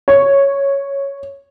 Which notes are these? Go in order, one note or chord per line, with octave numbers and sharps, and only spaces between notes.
C#5